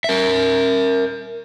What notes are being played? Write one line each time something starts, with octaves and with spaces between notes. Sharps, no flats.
A#4 E5